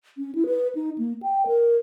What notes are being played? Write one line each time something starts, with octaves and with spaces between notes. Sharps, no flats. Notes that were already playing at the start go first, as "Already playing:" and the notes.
C#4
E4
B4
D#4
A#3
G5
A#4